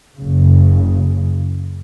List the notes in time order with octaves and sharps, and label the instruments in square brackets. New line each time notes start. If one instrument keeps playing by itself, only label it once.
[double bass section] F#1 C#3